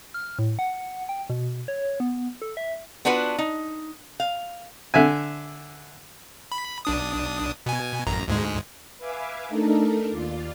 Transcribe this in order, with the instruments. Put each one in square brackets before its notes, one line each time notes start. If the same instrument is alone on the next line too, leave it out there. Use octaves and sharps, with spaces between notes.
[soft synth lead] F6
A2
F#5
G5
B2
C#5
B3
A4
E5
[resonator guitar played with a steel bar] B3 D4 F4 F#4 B4
D#4
F5
[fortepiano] D3 E5 G#5
[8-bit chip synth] B5
B1 D4 D#6
B2 G#5
A1 F#2 A#5
D2 G#2 G#3
[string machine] B4 E5 F5 G#5 D6
A3 D4 D#4 A4 A#4
D#2 F4 D5